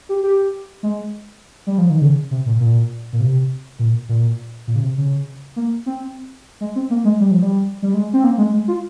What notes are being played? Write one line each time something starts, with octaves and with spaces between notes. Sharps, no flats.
G4
G4
G#3
G3
F3
D#3
C#3
C3
A#2
A#2
A#2
C3
A#2
A#2
A#2
C#3
C3
C#3
A#3
C4
G#3
C4
A#3
G#3
G3
F3
G3
G3
G#3
C4
A#3
G#3
G#3
F4